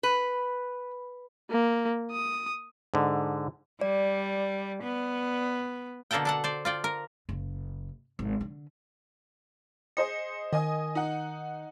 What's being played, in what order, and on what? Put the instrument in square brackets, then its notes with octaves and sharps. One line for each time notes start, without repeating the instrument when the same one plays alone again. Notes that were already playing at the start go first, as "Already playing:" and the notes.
[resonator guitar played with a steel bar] B4
[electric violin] A#3
D#6
[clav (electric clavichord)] G#2 D3
[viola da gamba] G3 [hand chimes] D5
[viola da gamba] B3
[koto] B2 D3 A#3 A4 F#5 G5
D4 A4 F#5
C5 D5
F4 D5 G5
A#4
[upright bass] F#1
G#1
D3
[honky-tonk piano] G#4 C5 D#5 [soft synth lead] C#7
[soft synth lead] D#3 [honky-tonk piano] D#5 G#5 D#6
[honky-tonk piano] D#4 F#5